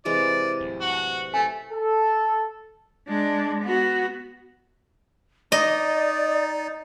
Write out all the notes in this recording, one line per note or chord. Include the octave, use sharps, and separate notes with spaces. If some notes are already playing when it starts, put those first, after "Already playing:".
C3 E3 G#3 D5
D1
F#4
A3 G#5
A4
G#3 D4
B3 F#4
D#4 D5 D#5